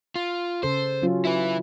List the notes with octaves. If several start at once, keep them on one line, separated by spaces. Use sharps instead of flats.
F4
C#3 A4 C5
F#3 C#4 F4
E4 B4